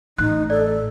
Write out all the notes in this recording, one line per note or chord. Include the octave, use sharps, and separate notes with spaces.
A1 D#4 F#6
A4 D5